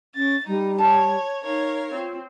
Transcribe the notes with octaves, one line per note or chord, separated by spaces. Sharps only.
C#4 A6
G3 D#4
C#5 A5
D#4 A#4 C#5 F5
C4 F4